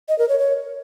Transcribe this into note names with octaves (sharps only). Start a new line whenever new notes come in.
D#5
A#4
C#5
C#5